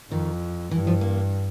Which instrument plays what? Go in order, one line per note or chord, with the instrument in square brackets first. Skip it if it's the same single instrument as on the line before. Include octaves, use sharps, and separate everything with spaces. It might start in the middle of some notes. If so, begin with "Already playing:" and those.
[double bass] F2 [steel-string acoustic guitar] D#3
[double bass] G2 [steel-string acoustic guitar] E3
[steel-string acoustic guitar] F3
A#3